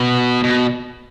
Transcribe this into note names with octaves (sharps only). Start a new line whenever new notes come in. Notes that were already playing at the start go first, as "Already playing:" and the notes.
Already playing: B2
B2